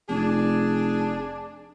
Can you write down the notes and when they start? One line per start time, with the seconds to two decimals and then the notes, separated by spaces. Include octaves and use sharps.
0.10 F1 D4 G#4